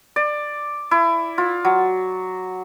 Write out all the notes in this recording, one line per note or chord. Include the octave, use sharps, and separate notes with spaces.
D5
E4
F4
F#3